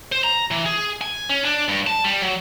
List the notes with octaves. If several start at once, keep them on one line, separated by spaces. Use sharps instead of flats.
C5
A#5
E3
G#4
G#5
C#4
D4
G2
A5
G3
F#3